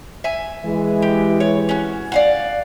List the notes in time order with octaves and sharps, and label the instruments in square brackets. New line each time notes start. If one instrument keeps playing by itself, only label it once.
[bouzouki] E5 G#5
[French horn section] E3 G#3
[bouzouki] G4
C#5
C#4 F#4
D5 F5 F#5